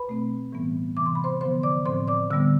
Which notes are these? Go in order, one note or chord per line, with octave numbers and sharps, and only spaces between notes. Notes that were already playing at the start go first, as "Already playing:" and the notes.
Already playing: B4 B5
B2 A3 C4
A2 E3 G3 B3
C3 E3 B3 D6
C6
B5
C5 C6
D3 F3 B3 C5 C6
D5 D6
A2 F3 C4 C5 C6
D5 D6
D3 G3 B3 E6